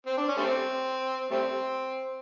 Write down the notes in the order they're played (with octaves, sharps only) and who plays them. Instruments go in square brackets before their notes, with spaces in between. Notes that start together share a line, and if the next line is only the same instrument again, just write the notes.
[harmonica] C4
D4
C#4
G3 A3 C4
G3 A3 C4